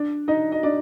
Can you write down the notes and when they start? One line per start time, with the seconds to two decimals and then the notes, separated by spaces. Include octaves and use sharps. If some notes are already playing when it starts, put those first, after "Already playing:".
Already playing: D4 D5
0.28 D#4 D#5
0.52 D#5
0.63 D4 D5